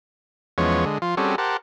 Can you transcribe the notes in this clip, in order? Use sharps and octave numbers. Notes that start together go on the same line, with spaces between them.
E2 F3 G#3 B3 C#4 C#5
D3 G#3
F3 F4
G3 C4 C#4 F#4 G#4 A4
G4 A#4 C5 F#5 A5